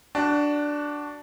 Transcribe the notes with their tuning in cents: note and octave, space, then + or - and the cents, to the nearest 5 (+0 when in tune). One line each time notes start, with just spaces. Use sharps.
D4 +0 F#4 +20